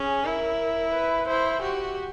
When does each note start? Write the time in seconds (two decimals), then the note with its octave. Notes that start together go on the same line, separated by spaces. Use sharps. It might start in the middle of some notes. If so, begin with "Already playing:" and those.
Already playing: C#4 G#4
0.25 E4 A#4
0.93 B4
1.27 E4 C5
1.62 F#4 G4